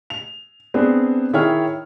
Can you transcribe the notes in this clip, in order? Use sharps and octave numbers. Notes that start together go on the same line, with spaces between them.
F7
B3 C4 D4 G#4
D#3 E4 G#4 C#5 G5 F6